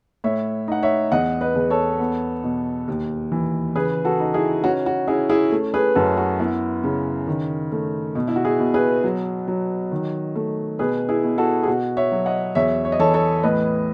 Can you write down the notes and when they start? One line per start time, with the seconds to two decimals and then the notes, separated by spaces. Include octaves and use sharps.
0.24 A2 C#5 E5
0.68 D#4 F#5
0.83 C#5 E5
1.12 E2 D#5 F#5
1.41 B4 D#5
1.55 E2
1.70 A4 C#5
2.00 B3
2.44 B2
2.88 D#2
3.32 E3
3.76 C#3 G#4 B4
4.05 F#4 A4
4.20 D#4
4.34 E4 G#4
4.64 C#4 F#4
4.86 F#4
5.08 C#4 E4 G#4
5.29 E4 G#4
5.52 A3
5.74 G#4 B4
5.95 F#2 F#4 A4
6.17 F#4
6.39 B3 E4
6.84 C#3
7.27 D#3
7.72 A3
8.15 B2
8.28 E4
8.36 F#4
8.45 E4 G#4
8.59 B2
8.74 G#4 B4
9.04 F#3
9.48 F#3
9.92 D#3
10.35 A3
10.79 B2 G#4 B4
11.09 E4 G#4
11.24 B2
11.38 F#4 A4
11.63 G#4
11.67 B2 F#4
11.97 C#5 E5
12.12 F#3
12.26 D#5 F#5
12.55 E2 C#5 E5
12.85 C#5
12.92 D#5
12.99 E3 A4 C#5
13.14 A4 C#5
13.43 A2 B4 D#5